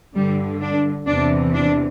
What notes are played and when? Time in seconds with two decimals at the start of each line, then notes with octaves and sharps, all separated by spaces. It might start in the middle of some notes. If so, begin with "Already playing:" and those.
0.15 G2 D3 G3
0.61 D4
1.07 E2 C3 E3 D4
1.53 D4